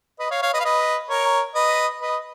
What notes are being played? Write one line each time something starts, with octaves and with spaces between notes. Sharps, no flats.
B4 D#5
C#5 F5
C#5 F5
B4 D#5
F5
B4 D#5
A#4 C#5
B4 D#5
B4 D#5